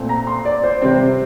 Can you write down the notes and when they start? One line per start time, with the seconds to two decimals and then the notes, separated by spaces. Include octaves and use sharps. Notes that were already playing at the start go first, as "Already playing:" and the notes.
Already playing: A#2 A3 C4
0.09 A#5
0.27 C6
0.45 D5
0.63 C5
0.82 C3 G3 C4